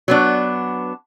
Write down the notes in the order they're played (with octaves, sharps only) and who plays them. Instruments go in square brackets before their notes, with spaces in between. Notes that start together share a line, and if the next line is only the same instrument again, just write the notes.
[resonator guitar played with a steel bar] F#3 B3 D4